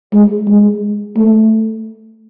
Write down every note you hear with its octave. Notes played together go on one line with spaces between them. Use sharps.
G#3
G#3
A3